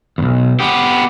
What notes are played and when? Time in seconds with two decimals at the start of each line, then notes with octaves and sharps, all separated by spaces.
0.18 B1 E2
0.60 B3 G4